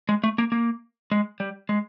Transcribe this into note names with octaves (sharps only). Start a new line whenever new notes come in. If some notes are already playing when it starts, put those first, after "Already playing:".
G#3
A3
A#3
A#3
G#3
G3
G#3